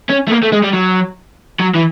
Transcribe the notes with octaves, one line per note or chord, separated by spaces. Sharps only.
C#4
A3
A#3
A3
G#3
G3
F#3
F#3
E3